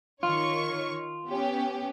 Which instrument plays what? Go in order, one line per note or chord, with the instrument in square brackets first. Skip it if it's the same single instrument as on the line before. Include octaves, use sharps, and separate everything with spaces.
[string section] D#3 C#5 C#6 [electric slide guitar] F4
[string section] B3 C#4 G4